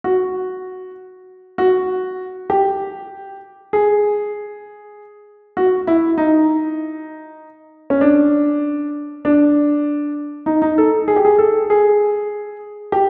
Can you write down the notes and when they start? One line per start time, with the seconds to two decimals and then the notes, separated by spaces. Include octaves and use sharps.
0.04 F#4
1.58 F#4
2.50 G4
3.73 G#4
5.57 F#4
5.87 E4
6.18 D#4
7.90 C#4
8.01 D4
9.25 D4
10.46 D#4
10.62 D#4
10.78 A4
11.08 G#4
11.16 G4
11.25 G#4
11.38 A4
11.70 G#4
12.92 G4